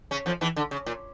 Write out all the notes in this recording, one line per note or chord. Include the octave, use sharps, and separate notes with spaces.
C#3 C#4
F2 F3
E2 E3
D3
C#3
A#2